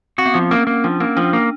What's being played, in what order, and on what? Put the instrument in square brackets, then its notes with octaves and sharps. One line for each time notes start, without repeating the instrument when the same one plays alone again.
[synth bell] C4 [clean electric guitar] F#4
[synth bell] B3
[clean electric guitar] F3 [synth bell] C4
[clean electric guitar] A#3 [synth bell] C#4
[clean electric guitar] A#3
[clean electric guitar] F3 [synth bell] D4
[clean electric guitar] A#3 [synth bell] C#4
[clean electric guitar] F3 [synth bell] D4
[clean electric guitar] A#3